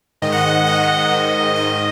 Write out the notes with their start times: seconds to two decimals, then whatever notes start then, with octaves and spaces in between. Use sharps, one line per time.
0.22 G#2 D#3 D#5
0.32 F#5
0.37 D#5
0.51 D#5
0.66 G#2 D#3 D#5
1.11 G#2 D#3
1.55 G#2 D#3 D#5